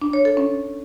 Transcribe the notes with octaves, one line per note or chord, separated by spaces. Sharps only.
D4
C#5
A4
C#4